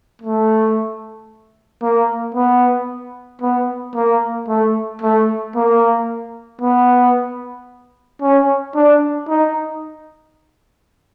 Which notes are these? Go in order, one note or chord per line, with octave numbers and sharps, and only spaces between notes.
A3
A#3
B3
B3
A#3
A3
A3
A#3
B3
C#4
D4
D#4